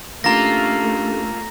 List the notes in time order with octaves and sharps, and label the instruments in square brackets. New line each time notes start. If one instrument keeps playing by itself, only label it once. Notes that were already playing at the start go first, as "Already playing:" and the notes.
[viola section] A3 [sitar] A#3 F4 [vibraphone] C#4 D4 G4 [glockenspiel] A#5 A#6